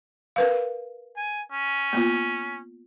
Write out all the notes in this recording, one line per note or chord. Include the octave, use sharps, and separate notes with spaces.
A#4 B4 F5
G#5
C#4
A#3 B3 F4